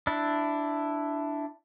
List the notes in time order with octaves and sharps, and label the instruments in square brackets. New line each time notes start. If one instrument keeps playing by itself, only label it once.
[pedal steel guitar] D4 E4